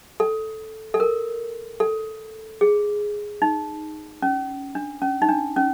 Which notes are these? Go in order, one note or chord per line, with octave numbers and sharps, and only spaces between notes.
A4
A4
A#4
A4
G#4
D#4
C#4
D4
C#4
D#4
D4
C#4